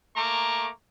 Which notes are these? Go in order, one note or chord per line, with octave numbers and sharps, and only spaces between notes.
A3 A#3 A#5 C#6 D6